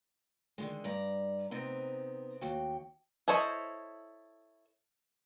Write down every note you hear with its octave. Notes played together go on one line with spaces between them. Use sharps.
D3 D#3 G#3
G2 D5 A#5
C3 B3 C4 D#4
D#2 F#4 G5
E4 A4 C5 C#5 D#5